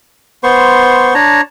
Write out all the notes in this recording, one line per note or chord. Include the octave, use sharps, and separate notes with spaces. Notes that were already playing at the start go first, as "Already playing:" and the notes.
B3 C5 C6 C#6
D4 C#5 A5 A#5